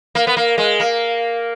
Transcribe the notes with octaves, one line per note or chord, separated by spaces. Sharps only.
A#3
B3
A#3
G#3
A#3